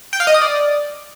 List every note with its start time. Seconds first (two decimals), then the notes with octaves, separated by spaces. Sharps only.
0.13 G5
0.20 F5
0.27 D#5
0.34 D#6
0.42 D5